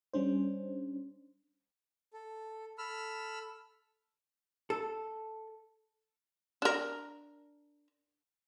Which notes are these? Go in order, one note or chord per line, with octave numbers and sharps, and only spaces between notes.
G3 C#4 D4 C5
A4
A4 B5 E6 F6
A4
D4 A#4